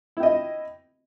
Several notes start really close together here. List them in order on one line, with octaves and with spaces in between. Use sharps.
E4 G5 D#5